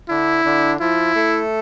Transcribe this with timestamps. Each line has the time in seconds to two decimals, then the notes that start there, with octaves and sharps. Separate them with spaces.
0.09 D3 D4 E4
0.45 D3 D4
0.80 F3 E4 F4
1.15 A3 A4